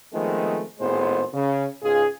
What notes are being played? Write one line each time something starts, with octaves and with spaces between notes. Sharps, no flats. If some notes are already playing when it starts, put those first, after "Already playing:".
D#3 F3 G#3 A3 B3 C4
G#1 A2 G#3 B3 C5
C#3
C#2 G#2 F4 G#4